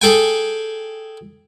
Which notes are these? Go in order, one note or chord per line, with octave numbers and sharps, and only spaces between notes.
G#4 A4 G5 G#5